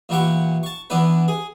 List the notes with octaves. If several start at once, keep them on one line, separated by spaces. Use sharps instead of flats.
E2 A#2 E4 G4 F#5 C#6
A5 C#6
E3 B3 D4 E4 B4
G#4